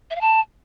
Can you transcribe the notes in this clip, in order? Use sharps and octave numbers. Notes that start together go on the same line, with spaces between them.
E5
F5
A5